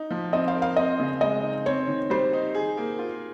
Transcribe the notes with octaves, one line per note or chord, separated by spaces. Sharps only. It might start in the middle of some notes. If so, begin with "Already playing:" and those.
Already playing: D#4
F3
C4 D#5
F5
A#4
F5
C4 D#5
C#3
G#3 D#5
D#4
C4 C#5
D#3
G3 C5
D#4
G#4
A#3
F4